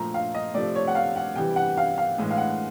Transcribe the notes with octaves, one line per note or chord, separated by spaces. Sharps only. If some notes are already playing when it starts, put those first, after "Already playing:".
Already playing: A#2 F3 A3 A#5
F5
D#5
C3 F3 A3 D5
C#5
F#5
F5
F#5
C3 E3 G3 G5
F#5
F5
F5
A2 E3 G#3
F5
F#5